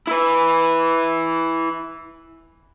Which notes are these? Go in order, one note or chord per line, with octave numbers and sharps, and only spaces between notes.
E4 B4